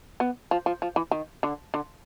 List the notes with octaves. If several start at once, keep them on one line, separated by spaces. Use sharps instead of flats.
B3
F3
F3
F3
E3
D#3
D3
D3